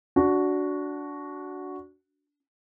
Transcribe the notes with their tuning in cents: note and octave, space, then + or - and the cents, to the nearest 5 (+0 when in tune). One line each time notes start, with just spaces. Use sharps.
D4 -15 F#4 +0